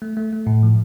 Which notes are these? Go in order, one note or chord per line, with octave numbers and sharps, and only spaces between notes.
A3
A3
A3
A2
F3